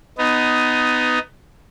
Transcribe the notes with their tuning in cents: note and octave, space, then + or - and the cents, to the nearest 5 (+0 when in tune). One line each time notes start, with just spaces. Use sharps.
B3 +20 D#4 +0